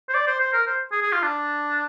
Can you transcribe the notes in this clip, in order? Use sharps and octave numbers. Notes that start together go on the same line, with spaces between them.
C5
D5
C5
C5
A#4
C5
G#4
G#4
F4
D4